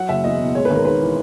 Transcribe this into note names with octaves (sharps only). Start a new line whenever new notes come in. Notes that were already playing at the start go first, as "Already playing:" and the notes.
Already playing: F#3 F#5
F#1 E5
E2 D#5
B2
G#3 C#5
B4
G#1 A#4
G#2 B4
E3